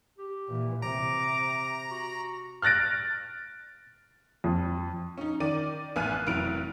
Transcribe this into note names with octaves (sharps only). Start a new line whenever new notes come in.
G4
A#2 E3
C3 A#5 D6
F#4
F6 F#6 A6 A#6 D7
F2
C#4 D#4
D#3 D5 D#7
A1 B3 G#5 F6 F#6 D#7
F#6
F1 E3 F#3 D7 F7